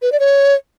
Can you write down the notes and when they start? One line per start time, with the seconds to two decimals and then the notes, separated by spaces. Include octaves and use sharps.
0.02 B4
0.12 D5
0.20 C#5